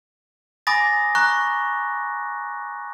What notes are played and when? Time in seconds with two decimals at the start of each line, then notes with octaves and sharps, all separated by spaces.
0.67 G#5 B5 D6 D#6 A6 A#6
1.15 A#5 C#6 F#6